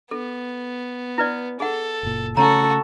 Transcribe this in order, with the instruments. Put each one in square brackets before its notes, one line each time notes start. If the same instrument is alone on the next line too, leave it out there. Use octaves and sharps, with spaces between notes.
[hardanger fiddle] B3 [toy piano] A4
[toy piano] E4 B4 D5
[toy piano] G#4 F#5 [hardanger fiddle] A4
[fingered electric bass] F#1 A#2
[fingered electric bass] C#3 A3 C#4 [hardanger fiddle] F#4 [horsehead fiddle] A4 [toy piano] C#5 A5 A#5